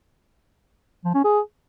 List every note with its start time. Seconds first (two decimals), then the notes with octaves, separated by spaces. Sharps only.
1.04 F3
1.14 C#4
1.24 G#4